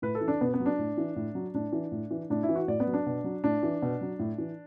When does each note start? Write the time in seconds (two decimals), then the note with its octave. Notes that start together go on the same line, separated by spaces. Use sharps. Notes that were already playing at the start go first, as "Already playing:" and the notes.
0.02 A2 B4
0.15 A4
0.21 E3
0.28 D4
0.41 B2 B3
0.54 B3
0.60 F#3
0.66 D4
0.79 A2
0.97 E3
1.16 A2
1.35 F#3
1.54 A2 D4
1.73 E3
1.92 A2
2.11 E3
2.30 A2 D4
2.43 E4
2.49 E3
2.55 F#4
2.68 A2 D5
2.80 B3
2.87 F#3
2.94 D4
3.06 B2
3.24 F#3
3.44 A2 D4
3.63 E3
3.82 B2
4.01 F#3
4.19 A2
4.38 E3